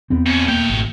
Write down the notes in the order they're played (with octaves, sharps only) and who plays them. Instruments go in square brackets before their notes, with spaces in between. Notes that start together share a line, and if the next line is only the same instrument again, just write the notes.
[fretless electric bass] E2 B3 C4
[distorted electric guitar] F2 C#4
[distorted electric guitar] A3 G5 [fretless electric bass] A#3
[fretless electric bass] G#1